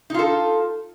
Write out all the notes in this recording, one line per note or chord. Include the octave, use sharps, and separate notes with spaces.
D#4 F4 A4